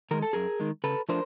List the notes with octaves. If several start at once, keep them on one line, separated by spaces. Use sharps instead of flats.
D#3 G#3 A#4
A4
F#2 G#4 A#4
D#3 G#3
C#3 A4 B4
F3 A3 D4 A#4 C5